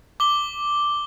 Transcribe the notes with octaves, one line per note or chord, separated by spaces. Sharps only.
D6 G7